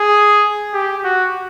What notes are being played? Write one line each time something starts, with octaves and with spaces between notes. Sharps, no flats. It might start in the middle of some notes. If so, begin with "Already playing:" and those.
Already playing: G#4
G4
F#4